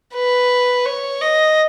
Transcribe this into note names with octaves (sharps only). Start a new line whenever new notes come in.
B4
C#5
D#5